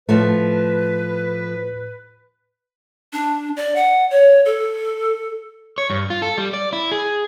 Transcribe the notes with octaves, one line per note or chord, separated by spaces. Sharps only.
A2 F3 A3 B4
D4
D5
F#5
C#5
A4
C#5
G2
F4
A4
G3
D5
E4
G#4